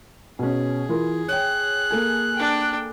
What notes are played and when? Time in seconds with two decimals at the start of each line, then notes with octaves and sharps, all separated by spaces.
0.39 B2 C#4 G#4
0.89 E3 F4 A#4
1.28 C#5 G5 F#6
1.91 A#3 A4 G#5
2.36 D4 G5